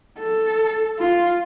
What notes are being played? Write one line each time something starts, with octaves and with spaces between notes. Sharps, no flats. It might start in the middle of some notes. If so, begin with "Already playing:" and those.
A4
F4